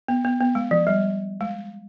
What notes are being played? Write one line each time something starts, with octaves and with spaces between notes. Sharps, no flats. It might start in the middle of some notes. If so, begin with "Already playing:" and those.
B3
B3
B3
G#3
F3
G3
G#3